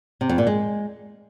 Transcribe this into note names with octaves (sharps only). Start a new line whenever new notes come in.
C3
F2
A#2
G#3